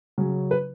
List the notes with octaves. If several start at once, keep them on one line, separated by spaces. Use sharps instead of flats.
C#3 F#3 C#4
B4